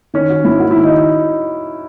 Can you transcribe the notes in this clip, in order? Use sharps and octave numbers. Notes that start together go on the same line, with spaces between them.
D#3 C#4
C#4 F#4
G#2 E4
A#3 F#4
E4
D#3
D#4